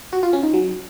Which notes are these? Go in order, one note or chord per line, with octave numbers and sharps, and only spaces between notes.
F#4
F4
C#4
D#4
F#3